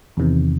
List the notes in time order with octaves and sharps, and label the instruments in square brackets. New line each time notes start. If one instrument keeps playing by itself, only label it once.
[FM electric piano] E2 C3 D#3